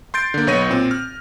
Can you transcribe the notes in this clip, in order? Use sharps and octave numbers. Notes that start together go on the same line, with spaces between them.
C6 G6 A6 D7
D3 A#3
B1 B3 C#5 C#6 A#6 D#7
A#2 C4
F6